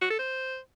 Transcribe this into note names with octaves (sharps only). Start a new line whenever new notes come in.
F#4
A4
C5